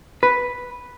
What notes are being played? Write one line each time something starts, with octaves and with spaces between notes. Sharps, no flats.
B4